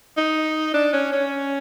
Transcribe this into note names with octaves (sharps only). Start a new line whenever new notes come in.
D#4
D4
C#4
C#4